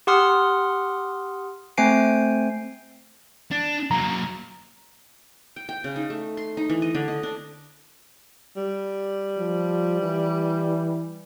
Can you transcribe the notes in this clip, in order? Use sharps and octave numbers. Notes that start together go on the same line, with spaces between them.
G4 F#5 C6 D#6 F6
A3 C4 C5 G#5 C7 D7
D4
F#3 A#3 A#5
G5
G5
C#3
D#4
A3
C6
D#4
E3
D#5
D3
D#5
D4
G3
F3
E3